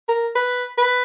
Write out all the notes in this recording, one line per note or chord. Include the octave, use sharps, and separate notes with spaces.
A#4
B4
B4